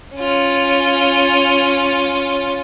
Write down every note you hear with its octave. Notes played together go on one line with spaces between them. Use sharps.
C#4 F4